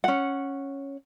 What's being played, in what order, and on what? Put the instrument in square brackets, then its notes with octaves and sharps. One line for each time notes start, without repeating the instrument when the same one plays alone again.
[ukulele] C#4 F#5